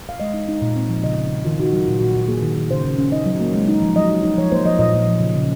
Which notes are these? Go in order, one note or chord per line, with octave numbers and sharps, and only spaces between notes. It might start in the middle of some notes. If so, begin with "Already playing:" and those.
F5
G#3 D#5
D#4
D#4
A#2
C4
F3
C#3 D#5
C#3
C#3
D#3 F4
D#4 F#4
F#3 F#4
A#2 F4
A#2 F#4
A#2
A#3 G#4
D#3
D#3
C#3 C5
C#3
C#4
D#4 D#5
F#3
A#3
G#3
D#4
F3
F#3 D#5
D#4
D#4
F3 C#5
A#3 C5
F3 D#5
A#2 D#5
A#2
F3
C#3
C#3